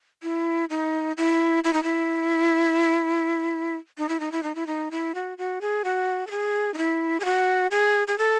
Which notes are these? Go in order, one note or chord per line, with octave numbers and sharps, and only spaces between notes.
E4
D#4
E4
E4
D#4
E4
D#4
E4
D#4
E4
D#4
E4
D#4
E4
F#4
F#4
G#4
F#4
A4
G#4
D#4
E4
G#4
F#4
G#4
G#4
A4